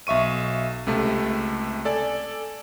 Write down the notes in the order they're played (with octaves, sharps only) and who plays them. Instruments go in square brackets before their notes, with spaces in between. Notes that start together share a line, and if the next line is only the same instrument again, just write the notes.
[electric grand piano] B1 E5 C#6 D#7
C#2 C3 A3 A5
A4 D5 G#5